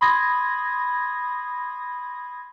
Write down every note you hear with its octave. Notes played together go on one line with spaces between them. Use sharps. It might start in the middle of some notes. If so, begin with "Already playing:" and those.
B5 C6 D#6 G#6 A#6